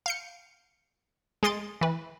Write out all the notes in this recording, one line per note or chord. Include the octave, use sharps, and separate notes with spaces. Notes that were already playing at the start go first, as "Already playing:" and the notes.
F5 G6 C#7
G#3 G#4 D#5 C6 A6 D7
E3 B4